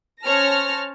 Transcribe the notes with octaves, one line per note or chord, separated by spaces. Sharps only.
C#4 C5 C#5 A5 F6 A#6